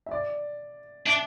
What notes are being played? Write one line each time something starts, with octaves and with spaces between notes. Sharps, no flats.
E5
D5
D4 E5